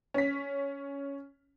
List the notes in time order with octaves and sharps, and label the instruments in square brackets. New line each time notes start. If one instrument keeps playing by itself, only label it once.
[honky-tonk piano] C#4 B6